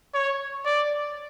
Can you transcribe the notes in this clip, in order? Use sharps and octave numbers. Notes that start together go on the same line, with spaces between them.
C#5
D5